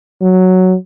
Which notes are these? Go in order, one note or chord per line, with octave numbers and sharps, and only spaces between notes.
F#3